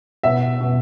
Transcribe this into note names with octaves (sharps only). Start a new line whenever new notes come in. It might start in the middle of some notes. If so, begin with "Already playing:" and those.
B2 E5
B2